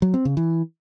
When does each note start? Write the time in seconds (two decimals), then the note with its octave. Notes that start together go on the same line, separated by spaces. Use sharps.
0.02 F#3
0.14 C4
0.25 C#3
0.37 E3